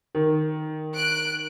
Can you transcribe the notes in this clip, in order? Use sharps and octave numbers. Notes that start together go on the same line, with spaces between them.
D#3
F#6 D7